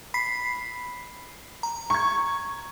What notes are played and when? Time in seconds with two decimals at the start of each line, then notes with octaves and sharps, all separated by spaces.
0.14 B5 B6 C7
1.63 A#5
1.90 C#6 G#6